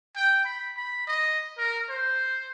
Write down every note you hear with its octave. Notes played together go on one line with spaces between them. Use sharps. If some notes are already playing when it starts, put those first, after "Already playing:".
G5
B5
B5
D#5
A#4
C5